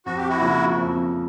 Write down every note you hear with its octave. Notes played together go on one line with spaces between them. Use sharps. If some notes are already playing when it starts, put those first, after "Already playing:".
F2 F#4
G4
E4 F#4
C#3 F3 A#3
F2